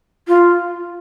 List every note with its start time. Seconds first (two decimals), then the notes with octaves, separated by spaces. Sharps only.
0.28 F4